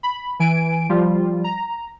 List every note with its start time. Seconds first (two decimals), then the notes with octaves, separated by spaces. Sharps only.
0.03 B5
0.40 E3 G#5 D7
0.89 F3 G3 F4
1.44 A#5